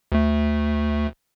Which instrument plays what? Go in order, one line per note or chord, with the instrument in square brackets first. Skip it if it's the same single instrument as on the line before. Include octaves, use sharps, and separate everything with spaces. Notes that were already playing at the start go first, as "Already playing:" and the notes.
[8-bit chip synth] D2 A3